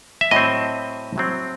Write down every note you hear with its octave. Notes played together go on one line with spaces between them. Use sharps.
E5
A2 F#3 C4 D#5
A2 F#3 C4